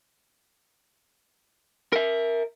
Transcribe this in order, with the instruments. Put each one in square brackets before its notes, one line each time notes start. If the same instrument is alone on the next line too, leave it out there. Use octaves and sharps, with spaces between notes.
[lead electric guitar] A#4 E5